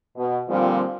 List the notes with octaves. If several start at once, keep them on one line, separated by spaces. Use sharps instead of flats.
B2
A#2 D3 F3 G3 A#3 C4